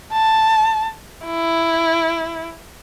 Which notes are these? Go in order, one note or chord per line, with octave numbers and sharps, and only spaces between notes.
A5
E4